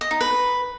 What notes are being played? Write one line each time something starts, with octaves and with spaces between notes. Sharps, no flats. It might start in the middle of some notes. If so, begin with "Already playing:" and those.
D#5
D#4
B4